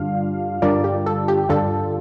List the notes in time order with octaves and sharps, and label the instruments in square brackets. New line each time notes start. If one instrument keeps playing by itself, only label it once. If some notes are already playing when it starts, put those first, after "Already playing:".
Already playing: [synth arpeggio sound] G2 D3 G3 D4 F4 F5
G2 D3 G3 D4 F4 A#4 D5
G4
A4
G4
G2 D3 G3 D4 F4 A4